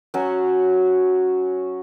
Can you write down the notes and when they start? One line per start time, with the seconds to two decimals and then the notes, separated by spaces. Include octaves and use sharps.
0.14 F#3 C#4 F#4 C#5